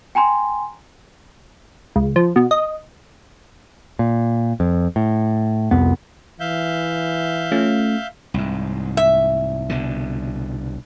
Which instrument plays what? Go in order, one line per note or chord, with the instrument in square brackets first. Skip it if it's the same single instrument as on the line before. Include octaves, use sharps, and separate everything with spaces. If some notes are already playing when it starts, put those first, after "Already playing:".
[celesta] G5 G#5 A#5 C6
[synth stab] C#2
F3
B2
D#5
[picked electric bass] A#2
F2
A2
C2 F2 B3
[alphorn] E3 [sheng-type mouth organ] E5 F5 G6
[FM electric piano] A3 C#4 F4
[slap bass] C2 G#2
[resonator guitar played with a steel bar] E5
[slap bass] C2 B2 D3